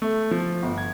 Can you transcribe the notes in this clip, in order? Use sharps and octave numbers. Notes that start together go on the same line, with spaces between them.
A3
F3
G1
G#6